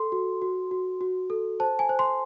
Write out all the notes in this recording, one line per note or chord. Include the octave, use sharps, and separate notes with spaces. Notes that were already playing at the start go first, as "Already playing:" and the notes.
Already playing: A4 C6
F#4
F#4
F#4
F#4
A4
C5 A5
G#5
C5
C6